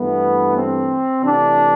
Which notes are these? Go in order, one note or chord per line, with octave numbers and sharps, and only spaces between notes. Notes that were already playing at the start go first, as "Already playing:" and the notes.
Already playing: G2 E3 A3 B3
C4
C3 E3 A3 D4